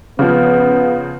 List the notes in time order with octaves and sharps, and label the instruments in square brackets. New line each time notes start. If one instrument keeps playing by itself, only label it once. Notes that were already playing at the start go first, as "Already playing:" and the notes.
[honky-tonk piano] C#3 F3 [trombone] B3